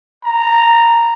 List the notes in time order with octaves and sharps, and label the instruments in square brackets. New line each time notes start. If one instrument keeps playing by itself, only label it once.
[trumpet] A#5